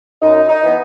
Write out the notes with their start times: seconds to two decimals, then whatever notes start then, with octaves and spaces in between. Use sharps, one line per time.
0.22 F#2 D#4
0.49 D#4
0.62 E3 B3